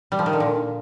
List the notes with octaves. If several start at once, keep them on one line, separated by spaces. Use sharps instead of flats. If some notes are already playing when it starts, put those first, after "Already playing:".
G3
F3
D#3
D3
A#2